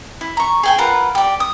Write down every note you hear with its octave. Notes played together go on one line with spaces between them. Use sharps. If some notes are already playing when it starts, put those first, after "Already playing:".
E4
A#5 C#6
G#4 G5 G#5
F4 A#4 B4 F#5
G4 D5
D#6